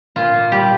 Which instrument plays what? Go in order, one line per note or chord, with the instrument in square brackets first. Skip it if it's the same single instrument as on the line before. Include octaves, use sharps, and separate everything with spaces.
[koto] A#2 F4
A#2
G3 G4